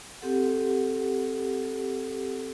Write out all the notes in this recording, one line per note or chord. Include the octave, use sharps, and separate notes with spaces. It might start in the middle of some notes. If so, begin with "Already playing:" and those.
C4 G4 A4 F#5